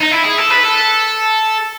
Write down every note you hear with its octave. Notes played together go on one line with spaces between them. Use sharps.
D#4
E4
G#4
A4
B4
A4